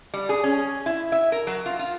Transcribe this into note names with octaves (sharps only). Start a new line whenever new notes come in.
G3
G#4
C#4
E4
E5
A#4
F#3
F4
F4